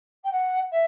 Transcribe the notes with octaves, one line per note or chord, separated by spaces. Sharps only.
G5
F#5
E5